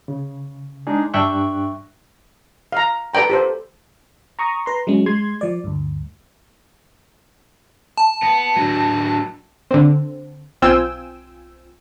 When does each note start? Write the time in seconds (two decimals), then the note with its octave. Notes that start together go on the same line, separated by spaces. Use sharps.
0.08 C#3
0.87 G#3 D4 D#4 G#4
1.14 G2 D4 E5 G5 C#6 F#6
2.72 F5 A#5
3.14 A4 B4 D5 G5 A#5
3.30 G4 A4 C5
4.39 A#5 C#6 D#6
4.66 B4 A#5 C6
4.87 F#3 G#3 C#4
5.06 G#3 C6 G#6
5.41 F3 D5
5.64 D2 G2
7.98 A5
8.23 B3
8.56 F#3 D4
9.71 D3 C4
10.62 B1 C4 F4 G5 G#5 E6